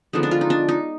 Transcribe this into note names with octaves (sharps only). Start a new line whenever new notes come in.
D3 F3 G#3 B3 D#4
D4
F4
D#4
D4
D#4